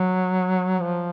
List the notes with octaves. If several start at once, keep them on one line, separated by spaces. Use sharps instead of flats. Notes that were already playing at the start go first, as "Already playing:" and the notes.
Already playing: F#3
F3